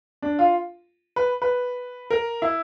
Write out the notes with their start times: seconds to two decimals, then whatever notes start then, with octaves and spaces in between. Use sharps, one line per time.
0.22 D4
0.39 F4
1.16 B4
1.42 B4
2.10 A#4
2.42 E4